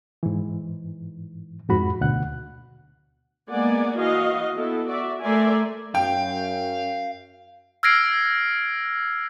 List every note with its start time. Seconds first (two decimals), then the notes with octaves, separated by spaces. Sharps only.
0.23 G#2 E3
1.69 F2 G#2 F#4 B5
2.01 D2 B2 F#5 F#6
3.50 G#3 A#3 B3 D5 F#5 G#5
3.96 E3 F#4 D#5 F5
4.55 B3 E4 A4
4.88 F#4 D5 E5
5.22 A3 A#4 D5 E5 G#5 C6
5.95 F#2 F5 G5
7.83 E6 F6 G#6 A#6 C7 D7